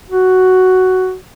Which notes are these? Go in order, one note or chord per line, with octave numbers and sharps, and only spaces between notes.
F#4